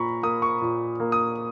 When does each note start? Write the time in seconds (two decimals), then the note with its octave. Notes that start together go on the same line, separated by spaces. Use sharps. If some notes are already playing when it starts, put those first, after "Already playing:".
Already playing: A#2 A#3 A#5 B5 C#6
0.23 A#3 D#6
0.42 C#6
0.62 A#2
1.00 A#3
1.12 D#6